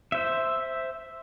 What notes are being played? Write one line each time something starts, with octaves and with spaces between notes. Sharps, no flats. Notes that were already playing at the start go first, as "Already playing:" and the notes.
C5 E5